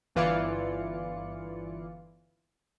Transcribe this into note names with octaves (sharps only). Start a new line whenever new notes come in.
G1 E3 F4 D5 C#7